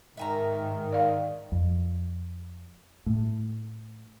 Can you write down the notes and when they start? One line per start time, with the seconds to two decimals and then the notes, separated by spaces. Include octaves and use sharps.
0.17 G#2 D#3 E5 G#5 A#5
0.92 D5 F5
1.52 F2
3.06 A2